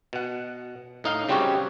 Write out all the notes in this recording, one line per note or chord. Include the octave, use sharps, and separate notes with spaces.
B2 F#5
A2 D#4 F5
C#3 G3 C4 F#4 G4 C#5